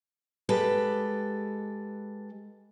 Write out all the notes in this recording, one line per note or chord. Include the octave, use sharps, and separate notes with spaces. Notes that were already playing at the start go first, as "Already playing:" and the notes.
G#3 G4 A4 B4